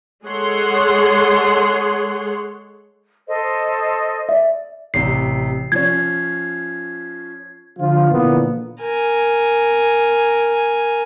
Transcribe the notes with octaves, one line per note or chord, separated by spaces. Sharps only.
G#3 G#4 A4 C#5 F#5 C6
A4 C5 D#5
D5 E5
A1 C3 C7
F3 C#4 G#6
D3 F3 F4
A#2 D3 E3 F3 A#3 B3
A#4 G#5